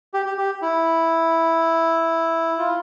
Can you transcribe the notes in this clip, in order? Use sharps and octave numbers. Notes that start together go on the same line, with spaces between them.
G4
G4
G4
E4
F4